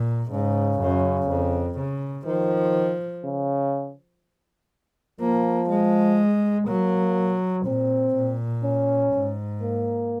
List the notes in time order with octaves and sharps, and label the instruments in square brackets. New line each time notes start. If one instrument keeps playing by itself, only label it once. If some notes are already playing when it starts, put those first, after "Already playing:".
Already playing: [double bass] A#2
[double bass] G#2 [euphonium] C#3
[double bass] F#2
F2
C#3
[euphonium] D#3 [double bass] F3
[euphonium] C#3
[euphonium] F3 [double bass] A#3
[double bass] G#3
[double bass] F#3 [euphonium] A#3
[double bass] A#2 [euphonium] C4
[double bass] A#2
[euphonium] C#4
[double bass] G#2
[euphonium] A#3